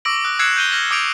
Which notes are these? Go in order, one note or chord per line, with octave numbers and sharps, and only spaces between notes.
C#6 D6 E6 A#6 D7 F#7
D#6 F#6
E6 F#6 G#6 C7 C#7 E7
G6 D#7 G7
F6 A#6 E7 F#7
D6 D#6 G6 C#7 D7 F7